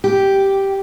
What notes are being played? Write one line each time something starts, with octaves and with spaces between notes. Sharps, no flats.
G4